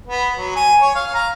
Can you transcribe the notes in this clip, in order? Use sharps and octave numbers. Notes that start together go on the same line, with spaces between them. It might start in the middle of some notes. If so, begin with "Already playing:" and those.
B3
F#3
G#5
C#5
F5
A#5